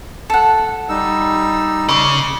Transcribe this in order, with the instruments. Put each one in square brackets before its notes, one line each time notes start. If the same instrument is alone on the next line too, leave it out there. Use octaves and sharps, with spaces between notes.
[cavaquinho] A4 F#5
[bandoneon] G3 D#4 E6
[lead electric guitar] C#3 [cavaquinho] C6 D6